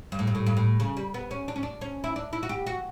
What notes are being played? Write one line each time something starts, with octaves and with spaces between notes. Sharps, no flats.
G2
A2
G2
A2
G2
A2
C#3
G3
B3
C#4
D4
C#4
D4
C#4
E4
D4
E4
F#4
G4
F#4